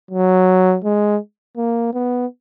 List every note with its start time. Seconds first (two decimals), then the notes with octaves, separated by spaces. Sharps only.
0.11 F#3
0.84 G#3
1.57 A#3
1.93 B3